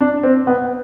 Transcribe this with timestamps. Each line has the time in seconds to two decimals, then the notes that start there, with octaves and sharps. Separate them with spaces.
0.01 D4
0.23 C4
0.47 B3